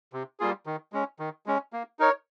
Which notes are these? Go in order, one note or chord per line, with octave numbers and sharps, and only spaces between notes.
C3
G3 A#3 F4 G#4
D#3
G#3 C#4
D#3
G#3 C#4
A#3
D#4 A#4 C#5